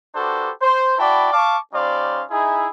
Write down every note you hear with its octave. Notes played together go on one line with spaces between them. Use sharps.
D4 F#4 G4 A4 B4 C5
C5
E4 F#4 D5 G5 A5 B5
F5 A5 C#6 D6
G3 C#4 D#4 C5 D5 F5
D#4 E4 G#4